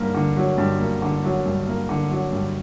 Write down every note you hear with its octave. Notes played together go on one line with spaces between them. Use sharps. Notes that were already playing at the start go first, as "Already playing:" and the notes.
Already playing: G2 A#3
D3
F#3
G2
A#3
D3
F#3
G2
A#3
D3
F#3
G2